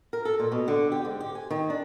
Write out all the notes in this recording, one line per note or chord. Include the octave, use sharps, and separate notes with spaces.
A#4
A4
A#2
B2
D3
G4
G#2
G4
G#5
D#3
D4